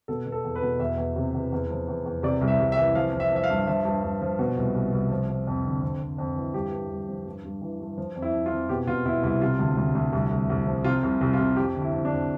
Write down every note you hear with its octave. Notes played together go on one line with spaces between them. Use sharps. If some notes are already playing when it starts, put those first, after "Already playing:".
B2 A4
B2
A4
E2
B4
B2
E2 E5
E2
C3
E2
E2
F3
E2
E2
C3 D5
C2
E5
C2
E5
E3
F3 F5
F3
E5
F3 E5
F5
G2
F3 E5
G2
G2
F3
B2
C2
C2
C2
F3
F3
F2
D3
F2
F2
F2
E3
G2 G4
G2
G2
F3
G2
G2
E3
G2
F3
F2
E4
F2
F4
F2
B2 G4
B2 F4
B2 E4
C2 E4
C3 F4
D2
D2
D2
C2
C2
C2
F3
C3 F4
C2
C2
F4
C3
F2 G4
D3
E4
F3
D4
F2